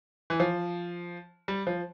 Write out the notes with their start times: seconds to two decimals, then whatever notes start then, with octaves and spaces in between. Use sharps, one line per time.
0.30 E3
0.40 F3
1.48 G3
1.67 F3